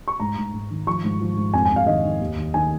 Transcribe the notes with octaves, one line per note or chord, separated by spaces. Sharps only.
C#6
G#2 A#5
G#2
G#2
D#3
F3 C#6
G#2
F3
G#2
F2 G#5
G#5
F2
F5
D#3 D#5
D#3
D#2
D#3
D#3 G#5